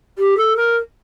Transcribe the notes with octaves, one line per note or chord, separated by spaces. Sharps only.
G4
A4
A#4